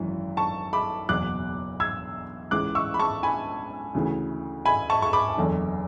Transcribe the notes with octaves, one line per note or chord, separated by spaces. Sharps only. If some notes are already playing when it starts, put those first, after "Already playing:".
Already playing: G#1 F#2 E3
A5 C#6
B5 D6
F#1 E2 B2 D6 F#6
E6 G#6
C#2 C#3 E3 D6 F#6
C#6 E6
B5
A5 C#6
G#5 B5
D2 C#3 E3
G#5 B5
A5 C#6
C#6
B5 D6
F#1 E2 D3